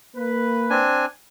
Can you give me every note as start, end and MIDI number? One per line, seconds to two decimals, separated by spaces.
0.16 0.85 58
0.16 0.85 71
0.70 1.05 60
0.70 1.05 62
0.70 1.05 80